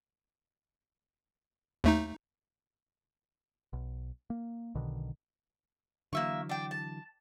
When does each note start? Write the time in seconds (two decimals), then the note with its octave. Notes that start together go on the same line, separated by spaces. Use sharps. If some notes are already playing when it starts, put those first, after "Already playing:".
1.84 D#2 A3 D#4
3.73 B1
4.30 A#3
4.75 B1 B2 D3 D#3
6.13 D3 E3 F#3 A#3 E5 C#6
6.49 D4 G5
6.71 A5